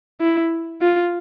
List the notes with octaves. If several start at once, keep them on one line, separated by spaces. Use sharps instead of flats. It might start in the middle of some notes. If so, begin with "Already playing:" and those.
E4
F4